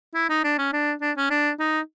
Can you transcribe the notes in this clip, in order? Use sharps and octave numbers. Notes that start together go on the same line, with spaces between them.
E4
D#4
D4
C#4
D4
D4
C#4
D4
D#4